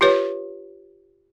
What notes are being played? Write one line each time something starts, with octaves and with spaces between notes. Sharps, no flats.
F4 G4 B4 C#5